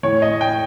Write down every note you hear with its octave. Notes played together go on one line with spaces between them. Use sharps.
A2 E3 C#5
D#5
G5